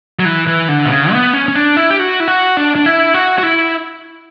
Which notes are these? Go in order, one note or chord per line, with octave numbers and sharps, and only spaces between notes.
F#3
E3
E3
D3
B2
C#3
B3
C#4
C#4
D4
E4
G4
F#4
E4
F#4
D4
D4
E4
F#4
F#4
E4